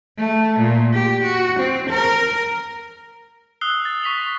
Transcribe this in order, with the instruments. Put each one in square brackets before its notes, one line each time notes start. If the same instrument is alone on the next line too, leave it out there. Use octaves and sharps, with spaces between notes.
[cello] A3
A#2
G4
F#4
C4
A#4
[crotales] D#6 E6 F#6 C7 G7
A6
C#6 B6 C7 F7 F#7